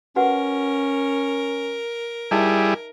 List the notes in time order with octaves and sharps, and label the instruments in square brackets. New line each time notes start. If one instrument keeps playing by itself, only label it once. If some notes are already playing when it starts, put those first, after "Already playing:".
[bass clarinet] C#4 [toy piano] F#4 B4 F#5 [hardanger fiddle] A#4
[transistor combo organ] G3 E4 G#4 [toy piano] D#4 D#5 E5